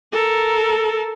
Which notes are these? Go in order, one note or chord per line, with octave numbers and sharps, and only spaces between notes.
A4 A#4